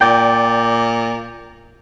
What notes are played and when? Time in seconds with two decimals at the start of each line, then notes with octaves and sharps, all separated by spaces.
0.01 A#2 D5 G5